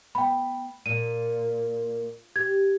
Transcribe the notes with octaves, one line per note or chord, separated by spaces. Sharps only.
B3 G5 B5
A#2 D#7
G4 G#6